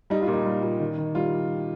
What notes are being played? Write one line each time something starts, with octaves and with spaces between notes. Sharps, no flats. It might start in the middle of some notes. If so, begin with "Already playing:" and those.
G3 D#4
F4
A#2
D#4
G3
A#2
D#3
D#3
G3 F4